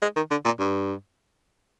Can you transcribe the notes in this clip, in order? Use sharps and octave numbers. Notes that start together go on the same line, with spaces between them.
G#3
D#3
D3
A#2
G2